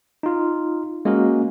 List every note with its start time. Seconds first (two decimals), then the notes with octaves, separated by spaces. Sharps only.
0.23 D#4 F4
1.05 G#3 A#3 C#4 F#4 A#4